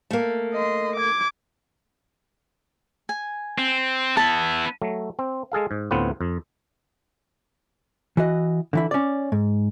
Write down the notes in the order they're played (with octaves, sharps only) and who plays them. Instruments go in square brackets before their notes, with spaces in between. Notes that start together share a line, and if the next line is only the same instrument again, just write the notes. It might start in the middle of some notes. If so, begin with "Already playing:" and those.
[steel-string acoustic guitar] A3 A#3
[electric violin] D#5 C6
D6 G#6
[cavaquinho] G#5
[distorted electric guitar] C4
[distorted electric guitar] B3 E4 [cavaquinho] A5
[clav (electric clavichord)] F#3 A3
C4
G#3 G#4 A4 F5
G#2
D2 A2 B3 C4 F4 B4
F2
[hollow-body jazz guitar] E3 F#4 D#5
D3 E3 E4
C#4 D5
G#2